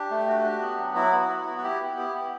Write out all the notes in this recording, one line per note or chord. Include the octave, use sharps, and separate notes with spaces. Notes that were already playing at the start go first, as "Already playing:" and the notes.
Already playing: D4 G4
A3
F#4
D4
B3
F#3
E4 F#4
B3
E4
B3
F#4
E4 G4
B3
E4 G4
B3